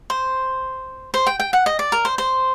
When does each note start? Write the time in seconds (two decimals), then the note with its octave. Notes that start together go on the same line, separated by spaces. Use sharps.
0.10 C5
1.14 C5
1.27 G5
1.40 G5
1.53 F#5
1.66 D#5
1.79 D5
1.92 A#4
2.05 C5
2.18 C5